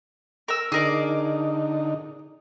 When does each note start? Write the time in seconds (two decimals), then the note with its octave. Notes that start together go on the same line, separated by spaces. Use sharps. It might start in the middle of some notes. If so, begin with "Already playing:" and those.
0.48 A#4 E6
0.72 D3 D#4 G#4 A#4 D5